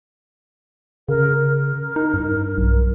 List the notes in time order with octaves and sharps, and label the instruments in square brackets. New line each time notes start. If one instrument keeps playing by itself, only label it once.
[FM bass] C#3 [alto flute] A#4
[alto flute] A#4
[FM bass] D#4
G2
B1